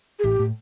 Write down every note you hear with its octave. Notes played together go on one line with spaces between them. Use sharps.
G#4
A1 A2 G4
A2